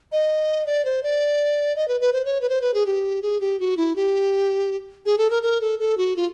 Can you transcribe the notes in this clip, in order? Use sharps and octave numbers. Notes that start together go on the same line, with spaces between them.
D#5
D5
C5
D5
D#5
B4
B4
C5
C#5
B4
C5
B4
G#4
G4
G#4
G4
F#4
E4
G4
G#4
A4
A#4
A#4
A4
A4
F#4
F4